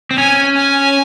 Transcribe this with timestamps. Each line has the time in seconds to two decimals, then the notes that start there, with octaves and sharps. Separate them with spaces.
0.11 C4
0.18 C#4 G#5
0.57 G#5